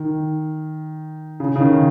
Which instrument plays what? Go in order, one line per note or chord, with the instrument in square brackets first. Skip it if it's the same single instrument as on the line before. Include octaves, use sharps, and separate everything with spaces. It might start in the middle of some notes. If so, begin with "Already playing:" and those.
Already playing: [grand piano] D#3
C#3
C#3
D#3